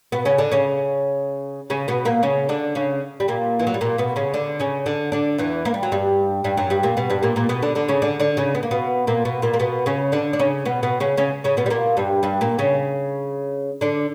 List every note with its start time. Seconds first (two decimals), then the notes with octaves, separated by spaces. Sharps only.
0.12 B2 B3
0.25 C#3 C#4
0.38 D3 D4
0.52 C#3 C#4
1.70 C#3 C#4
1.88 B2 B3
2.05 A#2 A#3
2.23 C#3 C#4
2.49 D3 D4
2.75 C#3 C#4
3.20 G3
3.28 A#2 A#3
3.59 E3
3.67 F#3
3.74 G3
3.81 A#2 A#3
3.98 B2 B3
4.16 C#3 C#4
4.34 D3 D4
4.60 C#3 C#4
4.86 D3 D4
5.12 D3 D4
5.38 E2 E3
5.65 A#3
5.74 G3
5.83 F#3
5.92 G2 G3
6.44 G2 G3
6.57 F#2 F#3
6.70 G2 G3
6.83 A#2 A#3
6.97 B2 B3
7.10 G2 G3
7.23 A#2 A#3
7.36 A#2 A#3
7.49 B2 B3
7.62 D3 D4
7.75 D3 D4
7.88 C#3 C#4
8.02 D3 D4
8.20 D3 D4
8.37 C#3 C#4
8.55 B3
8.63 A#3
8.71 B2 B3
9.07 A#2 A#3
9.25 B2 B3
9.42 A#2 A#3
9.54 A#3
9.60 B2 B3
9.86 C#3 C#4
10.12 D3 D4
10.33 D4
10.39 C#3 C#4
10.65 B2 B3
10.83 B2 B3
11.00 C#3 C#4
11.17 C#3 C#4
11.44 C#3 C#4
11.57 B2 B3
11.66 G3
11.70 A#2 A#3
11.97 G2 G3
12.23 G2 G3
12.41 A#2 A#3
12.59 C#3 C#4
13.81 D3 D4